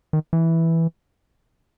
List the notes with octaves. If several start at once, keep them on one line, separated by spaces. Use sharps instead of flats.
D#3
E3